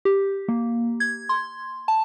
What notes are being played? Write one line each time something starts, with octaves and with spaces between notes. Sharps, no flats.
G4
A#3
G#6
C6
A5